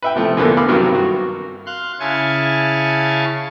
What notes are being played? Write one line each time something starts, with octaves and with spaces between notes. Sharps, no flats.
B4 E5 G5
C3 F3 A3
E2 D3 A#3 B3 A4
F5 B5 D6 E6
G2 C3 D#3 F#3
F#4
F5 C6 F#6
C#3 E4 F5 G#5 A5 C#6